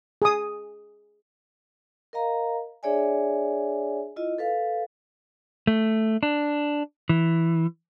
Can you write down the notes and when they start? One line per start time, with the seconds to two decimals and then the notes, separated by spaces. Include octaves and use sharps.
0.22 G#4 D#6
2.13 A#4 D#5 F5 A#5
2.83 D4 G#4 C#5 D5 E5 G#5
4.16 E4 F4 D#5
4.38 A4 B4 F5
5.67 A3
6.23 D4
7.09 E3